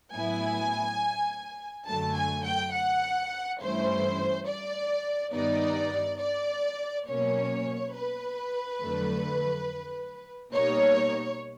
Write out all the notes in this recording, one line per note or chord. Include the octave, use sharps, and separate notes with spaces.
A2 F#3 B3 E4 G#5
F#2 D3 F#3 A3 A5
G#5
G5
F#5
G2 E3 A3 C#4 E4 C5
D5
G2 D#3 G3 B3 D#4 D5
D5
B2 F#3 A#3 C#4 C#5
B4
F2 D3 F#3 A3
B2 G3 A#3 D#4 C#5